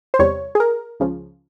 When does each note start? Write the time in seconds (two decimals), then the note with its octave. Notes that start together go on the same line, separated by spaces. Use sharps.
0.14 C5
0.19 E2 C3 G3 C#5
0.55 G#4
0.60 A#4
1.00 C#2 C#3 F3